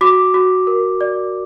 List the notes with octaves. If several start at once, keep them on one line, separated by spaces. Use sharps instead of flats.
F#4 D6
F#4
A#4
D5